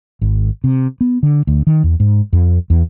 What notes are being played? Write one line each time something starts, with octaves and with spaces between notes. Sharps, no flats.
G#1
C3
B3
D3
D2
D#3
E2
G#2
F2
E2